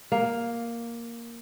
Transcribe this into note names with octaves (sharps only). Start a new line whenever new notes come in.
A#3